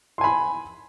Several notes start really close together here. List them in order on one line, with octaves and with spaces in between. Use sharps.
C6 G#5 B5